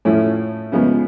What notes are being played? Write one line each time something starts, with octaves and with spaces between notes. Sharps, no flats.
A2 F3 A3 C#4 E4
C#3 F3 G#3 B3